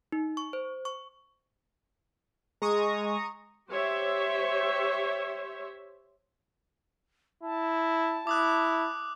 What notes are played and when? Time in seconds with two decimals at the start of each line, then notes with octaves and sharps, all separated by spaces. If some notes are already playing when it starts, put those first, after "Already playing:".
0.12 D#4
0.37 C#6
0.53 C5
0.85 C#6
2.62 G#3 A#5 C#6 D#6
3.70 G4 C5 C#5 E5
7.43 E4 A5
8.27 E4 D6 D#6 F#6